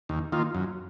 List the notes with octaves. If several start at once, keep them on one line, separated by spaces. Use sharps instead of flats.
D#2
D#3 A#3 F4
F#2